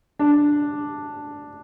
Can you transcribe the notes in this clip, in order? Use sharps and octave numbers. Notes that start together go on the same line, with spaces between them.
D4